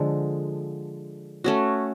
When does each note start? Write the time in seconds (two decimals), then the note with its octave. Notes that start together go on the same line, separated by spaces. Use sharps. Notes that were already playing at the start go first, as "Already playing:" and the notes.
Already playing: D3 F3 G#3
1.44 A3 C#4 F#4